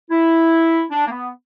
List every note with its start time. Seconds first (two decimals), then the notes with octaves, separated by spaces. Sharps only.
0.11 E4
0.91 D4
1.07 A#3
1.11 B3